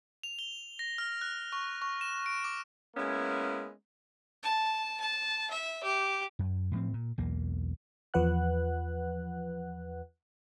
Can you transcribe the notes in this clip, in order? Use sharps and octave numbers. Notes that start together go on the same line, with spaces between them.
F7
G7
A#6
F6
F#6
C#6
C#6
E7
D7
D6
G#3 A#3 B3 C#4 E4
A5
A5
E5
G4
F#2
A2 F3 C4
A#2
B1 E2 A#3
E2 F3 B4 F#5 F#6